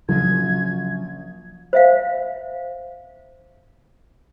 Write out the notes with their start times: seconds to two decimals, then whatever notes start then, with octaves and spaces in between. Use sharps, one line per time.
0.09 A#1 C#3 F#3 G#6
1.73 C5 E5 F5